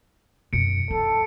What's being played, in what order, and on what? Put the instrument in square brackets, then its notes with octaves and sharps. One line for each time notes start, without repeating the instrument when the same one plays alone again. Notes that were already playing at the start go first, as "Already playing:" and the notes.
[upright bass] F#2 B2 [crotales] C#7 D7
[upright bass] D4 [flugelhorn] A4